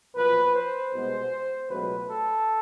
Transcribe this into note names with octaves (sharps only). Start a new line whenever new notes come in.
B1 A#2 F3 A#3 B4
C5
C2 B2 G#3 B3
C#2 B2 F#3 A3 B4
A4